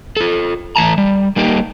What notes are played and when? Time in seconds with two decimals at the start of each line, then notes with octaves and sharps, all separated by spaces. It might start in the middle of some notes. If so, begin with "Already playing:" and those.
0.17 F4 A4
0.76 E3 A3 A5 A#5
0.98 G3
1.36 G3 A#3 D#4 G4